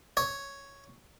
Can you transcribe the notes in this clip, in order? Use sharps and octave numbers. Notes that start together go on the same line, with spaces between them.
C#5